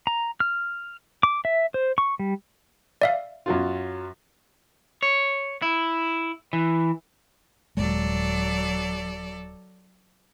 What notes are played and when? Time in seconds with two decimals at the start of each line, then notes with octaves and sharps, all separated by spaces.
0.07 A#5
0.40 F6
1.23 D6
1.45 E5
1.74 C5
1.98 C#6
2.19 G3
3.02 D5 E5 F5
3.46 F#2 F#3 F4
5.03 C#5
5.62 E4
6.53 E3
7.77 D#1 E2 F#3 G#3 A4 D5